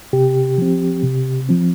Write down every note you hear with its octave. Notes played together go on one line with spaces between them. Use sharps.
C3 G4
F3 C4
C3
F3 C4